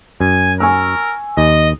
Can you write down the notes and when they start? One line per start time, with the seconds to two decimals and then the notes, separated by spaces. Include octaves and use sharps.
0.21 F#2 G#5
0.60 A#4 G#5 C#6 E6
1.37 D#2 D#5